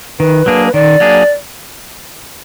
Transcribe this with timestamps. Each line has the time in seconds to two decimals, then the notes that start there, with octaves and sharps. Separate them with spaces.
0.19 D#3 B4
0.46 F#3 A#3 D4 G#4
0.66 B4
0.74 D#3 D5
1.00 F#3 A#3 D4 G#4